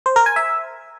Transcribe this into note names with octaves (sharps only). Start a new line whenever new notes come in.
C5
A#4
G#5
E5